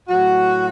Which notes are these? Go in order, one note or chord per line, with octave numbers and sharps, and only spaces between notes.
A2 F#3 F#4